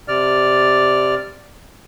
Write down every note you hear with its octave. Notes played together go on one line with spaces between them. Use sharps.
C3 D5 F6